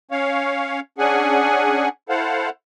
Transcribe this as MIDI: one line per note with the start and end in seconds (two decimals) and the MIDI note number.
0.11 0.80 61
0.11 0.80 73
0.11 0.80 77
0.98 1.89 61
0.98 1.89 62
0.98 1.89 68
0.98 1.89 78
0.98 1.89 80
2.09 2.49 64
2.09 2.49 69
2.09 2.49 72
2.09 2.49 77
2.09 2.49 78